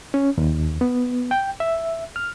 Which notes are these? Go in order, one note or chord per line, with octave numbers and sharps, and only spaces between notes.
C#4
D#2
B3
G5
E5
F6